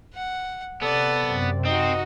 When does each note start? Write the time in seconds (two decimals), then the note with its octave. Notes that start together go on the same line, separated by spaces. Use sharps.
0.14 F#5
0.82 C3 B3 A4 D5
1.24 F#2 C3
1.65 C4 D#4 F#4 D#5